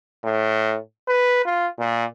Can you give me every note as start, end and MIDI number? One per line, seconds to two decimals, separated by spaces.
0.24 0.77 45
1.08 1.42 71
1.45 1.67 65
1.79 2.05 46